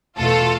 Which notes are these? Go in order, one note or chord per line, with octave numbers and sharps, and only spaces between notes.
E2 B2 A3 F4 A4